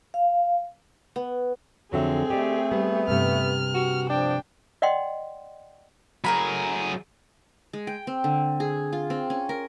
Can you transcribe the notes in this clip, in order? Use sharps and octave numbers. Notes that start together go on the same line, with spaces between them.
F5
B3
F2 D3 F#3 C4 G#4 E5
A3 G4 D5 D#5
G3 B3
G2 C3 F6
F#4
F3 D4 G5
D5 D#5 F#5 G5 C6
F#3 A3 G#4 A#4 B5
G#3
G5
C4
D3
G#4
F4
C4
C#4
A#4